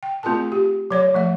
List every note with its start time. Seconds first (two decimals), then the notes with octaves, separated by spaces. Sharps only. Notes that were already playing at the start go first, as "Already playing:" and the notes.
0.03 G5
0.23 A3 C4 F4 G#4 A#4 A5
0.52 G4
0.91 F#3 C#5 D5
1.14 F3 A3 E5